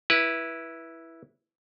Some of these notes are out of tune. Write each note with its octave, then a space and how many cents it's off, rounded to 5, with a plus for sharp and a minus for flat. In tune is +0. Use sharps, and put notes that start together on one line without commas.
E4 +0 B4 -20